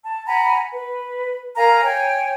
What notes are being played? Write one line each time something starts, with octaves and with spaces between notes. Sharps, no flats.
A5
F#5 G#5 A#5 B5
B4
A#4 F5 G#5 A#5
C#5 G5 G#5